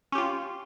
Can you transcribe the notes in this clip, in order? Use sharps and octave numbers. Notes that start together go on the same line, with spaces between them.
C#4 F4 G4